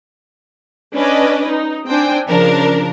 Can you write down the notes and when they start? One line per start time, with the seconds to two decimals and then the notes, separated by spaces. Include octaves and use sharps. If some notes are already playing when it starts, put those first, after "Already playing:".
0.95 C#4 D4 B4 D5 D#5
1.49 D#4
1.87 C4 D4 C5 G5 G#5
2.29 C#3 F3 D4 A#4